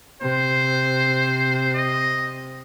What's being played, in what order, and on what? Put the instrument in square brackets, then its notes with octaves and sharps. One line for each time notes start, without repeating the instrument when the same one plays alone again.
[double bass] C3 [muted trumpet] C5
[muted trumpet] D#5